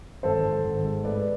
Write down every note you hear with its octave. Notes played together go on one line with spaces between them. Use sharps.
G#1 A4 C5
G#1
G#1
G#3
A3 B4 D5